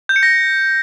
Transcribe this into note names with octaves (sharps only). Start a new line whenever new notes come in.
G6
C#7
A#6